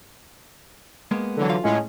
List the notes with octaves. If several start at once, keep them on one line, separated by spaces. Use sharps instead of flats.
G#3 A#3 B3
D3 E3 F#3
F4 F5
A2 G#3 C#4